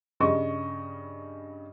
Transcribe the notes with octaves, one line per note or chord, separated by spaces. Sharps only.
G2 C#3 D#5 C#6